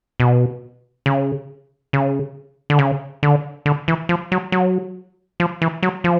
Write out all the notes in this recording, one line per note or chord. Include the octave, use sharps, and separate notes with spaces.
B2
C#3
C#3
D3
C#3
D3
D3
E3
F3
F#3
F#3
F3
E3
F#3
F3